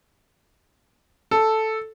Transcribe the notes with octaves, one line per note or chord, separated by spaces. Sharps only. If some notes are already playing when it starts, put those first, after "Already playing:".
A4